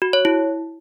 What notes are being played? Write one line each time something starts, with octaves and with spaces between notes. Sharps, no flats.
F#4
C#5
E4